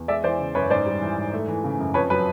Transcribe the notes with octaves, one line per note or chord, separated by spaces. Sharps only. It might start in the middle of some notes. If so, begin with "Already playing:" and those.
Already playing: E2
G#3 D5 E5
E3 C5 D5
C#3
F#2 B4 C#5
G#2 C5 D5
G3
E3
G#2
A3
E3
C#3
F#2
F2 B4 C#5
F#3 B4